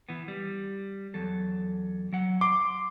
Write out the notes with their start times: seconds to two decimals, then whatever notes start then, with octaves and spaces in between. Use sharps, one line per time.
0.09 E3 B3
0.28 G3
1.14 E2 F#3 A4
2.12 F#3 F#5
2.41 C6 D6